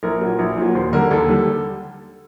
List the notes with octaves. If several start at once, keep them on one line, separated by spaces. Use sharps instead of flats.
A#1 A#4
A#2 F#3
A#1
A#2 F#3
D#2 C5
D3 G3 A#4
D#2 A4
D3 G3